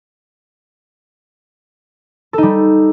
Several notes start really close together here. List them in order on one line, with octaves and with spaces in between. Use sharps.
A4 D#4 G3